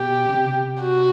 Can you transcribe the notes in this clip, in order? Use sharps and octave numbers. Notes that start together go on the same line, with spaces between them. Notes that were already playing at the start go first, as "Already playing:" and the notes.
Already playing: B2 G4
C#3
C3
F#4